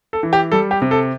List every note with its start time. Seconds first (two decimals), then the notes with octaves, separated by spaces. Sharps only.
0.13 A4
0.23 E3
0.33 G4
0.52 G3 A4
0.71 G4
0.82 C3
0.91 A4